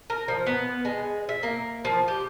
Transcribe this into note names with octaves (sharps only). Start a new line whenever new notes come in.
A#4
F3
B3
G#3
E5
A#3
F3
G4